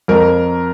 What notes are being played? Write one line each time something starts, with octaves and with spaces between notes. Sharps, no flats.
F2 A#4